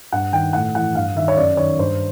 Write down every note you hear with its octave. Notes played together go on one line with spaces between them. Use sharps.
G2 F#5
D#3 G5
A2 F#5
E3 F#5
G2 F5
D#3 E5
C#5
F#2 D5
D#3 C#5
G2 C5